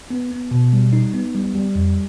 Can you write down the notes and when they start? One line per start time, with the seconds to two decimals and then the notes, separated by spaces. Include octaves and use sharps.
0.10 B3
0.31 B3
0.51 B2
0.73 G3
0.93 D#4
1.14 B3
1.35 G3
1.55 G3
1.75 F2